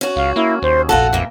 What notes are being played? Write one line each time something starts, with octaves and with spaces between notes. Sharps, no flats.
C#4 F#4
C#2 F5
A#3 E4
D#2 C5
F1 A#1 F4 F#4 A4 F#5
F2 E3 A#3